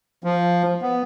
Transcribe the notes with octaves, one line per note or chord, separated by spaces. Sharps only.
F3
B3